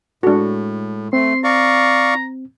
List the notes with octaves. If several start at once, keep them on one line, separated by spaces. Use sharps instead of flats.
A2 G#3 D4 F#4 A4
A3 C4 C6
D5 F5 A#5 C#6